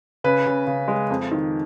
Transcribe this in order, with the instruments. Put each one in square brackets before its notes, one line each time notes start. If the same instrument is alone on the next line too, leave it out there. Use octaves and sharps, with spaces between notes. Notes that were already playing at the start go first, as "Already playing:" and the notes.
[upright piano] C#3 B4
C#3
C#3
G#3
F2
D#3